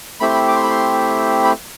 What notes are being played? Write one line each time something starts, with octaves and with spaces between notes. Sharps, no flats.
A3 C4 E4 G4 B5
C6
B5
D6
C6
B5
C6
B5